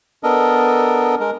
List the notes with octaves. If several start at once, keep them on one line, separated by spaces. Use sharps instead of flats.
B3 D4 A4 A#4 D#5
G#3 A#4